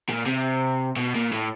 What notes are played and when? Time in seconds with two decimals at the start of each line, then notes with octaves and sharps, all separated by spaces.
0.09 A#2
0.26 C3
0.96 B2
1.15 A#2
1.32 A2